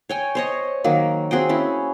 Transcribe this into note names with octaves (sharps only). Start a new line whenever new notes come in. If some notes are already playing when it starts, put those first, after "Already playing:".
C#5 G5 G#5
C5 C#5 D#5
D#3 F#3 A#3
C4 F#4 G#4 G5
C#4 E4